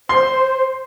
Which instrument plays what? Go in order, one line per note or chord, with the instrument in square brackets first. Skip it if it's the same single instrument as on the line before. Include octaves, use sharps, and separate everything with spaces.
[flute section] C5 [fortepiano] C6